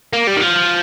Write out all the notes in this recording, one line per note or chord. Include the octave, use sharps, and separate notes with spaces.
A#3
G3
D#3
F3